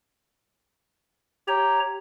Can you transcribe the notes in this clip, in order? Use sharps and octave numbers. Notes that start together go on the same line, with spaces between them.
G4 C#5 A#5